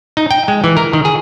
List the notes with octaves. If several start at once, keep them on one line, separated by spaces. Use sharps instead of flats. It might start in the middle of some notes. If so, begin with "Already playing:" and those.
D#4
G5
G#3
E3
A#4
D#3
G#4